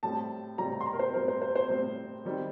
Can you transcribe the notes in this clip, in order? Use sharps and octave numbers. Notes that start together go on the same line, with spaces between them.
A2 G3 C4 A5
A2 G3 C4 A#5
A#5
C6
A#5
A#4
C5
A2 G3 C4 A#4
C5
C5
C5
A2 G3 C4
D#3 G3 C4